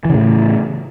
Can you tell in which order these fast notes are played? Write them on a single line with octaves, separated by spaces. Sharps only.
E3 C#3 A2